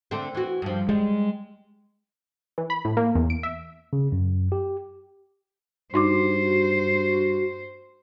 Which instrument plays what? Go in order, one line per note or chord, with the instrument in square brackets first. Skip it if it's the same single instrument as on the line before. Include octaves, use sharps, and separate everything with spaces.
[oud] D3 A3 C4
E3 F#4
G2 F3
[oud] G3 [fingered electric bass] G#3
[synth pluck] E3
B5
A2
A#3
E2
D7
E5
[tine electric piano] C#3
F#2
G4
[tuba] G2 [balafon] D#4 C6 D6 [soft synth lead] F#4 [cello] C5